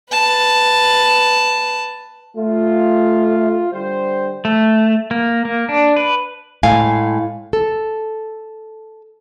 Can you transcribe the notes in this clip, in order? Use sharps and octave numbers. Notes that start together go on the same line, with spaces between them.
B4 A5
A3 F4
D3 G3 C5
A3
A#3
A#3
D4
B4
A2 G#3 F5 G#5
A4